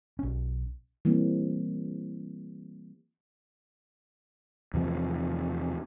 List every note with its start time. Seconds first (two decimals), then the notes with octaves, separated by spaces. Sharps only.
0.19 B1 C#4
1.05 E3 G3 A#3 C4
4.74 E2 C3 F3